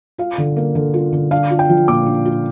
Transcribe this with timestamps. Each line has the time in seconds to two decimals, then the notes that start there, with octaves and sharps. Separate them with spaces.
0.18 F4 F5
0.38 D3
0.57 A#3
0.75 D3
0.94 F4
1.12 D3
1.31 D4 F5
1.50 F4
1.59 G5
1.69 F3
1.88 A#2 D6
2.06 D4
2.25 F4